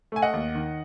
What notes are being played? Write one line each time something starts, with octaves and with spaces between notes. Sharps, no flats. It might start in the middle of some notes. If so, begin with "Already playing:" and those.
A3 G#5
D#5 F#5
D#2
D#3